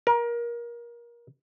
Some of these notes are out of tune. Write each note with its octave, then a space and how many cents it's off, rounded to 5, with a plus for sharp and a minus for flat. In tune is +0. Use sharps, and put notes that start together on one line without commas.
A#4 +25